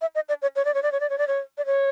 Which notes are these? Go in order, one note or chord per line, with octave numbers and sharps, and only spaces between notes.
E5
D#5
D5
C#5
C#5
D5
C#5
D5
C#5
D5
C#5
D5
C#5
D5
C#5